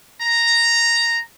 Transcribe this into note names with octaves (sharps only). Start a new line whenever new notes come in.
A#5